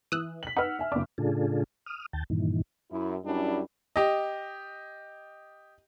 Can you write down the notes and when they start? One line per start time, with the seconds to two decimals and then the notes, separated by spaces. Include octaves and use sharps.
0.12 E3 D#6 E6 F#6
0.43 B6 F#7
0.56 D#4 B4 F#5 E6 F6
0.79 E5 G#5
0.92 F#1 D4 D6
1.18 A2 C#3 D4 F4 G#4 A4
1.86 D#6 F6
2.13 D#2 G5 A5
2.30 G2 A#2 D#3 E3
2.91 F#2 E4
3.25 F#2 G3 C#4 D4 E4
3.96 G4 D#5